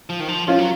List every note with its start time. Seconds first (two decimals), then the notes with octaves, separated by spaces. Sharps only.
0.09 F3
0.20 D#3
0.28 F3
0.47 F3 C#4 F4
0.59 F#3